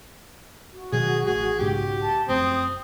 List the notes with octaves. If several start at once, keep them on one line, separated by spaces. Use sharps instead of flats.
F#4
B2 D#3 F#3 G#4
A1 G#4
B1 G#2 C#3 G4
A5
F1 F#2 C4 D#6